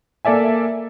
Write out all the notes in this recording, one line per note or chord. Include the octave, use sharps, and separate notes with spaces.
A#3 A4 D5 E5 G#5